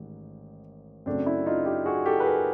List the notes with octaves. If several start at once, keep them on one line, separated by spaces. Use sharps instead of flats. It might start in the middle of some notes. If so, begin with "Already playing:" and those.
Already playing: A1 G#2 D#3
F#2 C#3 F#3 A3 C4 D4
D4 E4
D#4 F4
F4 G4
F#4 G#4
G4 A4
B4
G#4 A#4